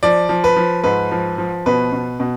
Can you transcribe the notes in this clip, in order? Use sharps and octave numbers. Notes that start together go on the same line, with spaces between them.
F3 D5
F3
B4
F3
G#2 B4
F3
F3
B2 B4
B2
B2